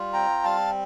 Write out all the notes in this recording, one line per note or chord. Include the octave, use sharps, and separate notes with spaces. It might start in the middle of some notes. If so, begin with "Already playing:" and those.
Already playing: G3 F4
C4 G5 A#5
G3 F5 A5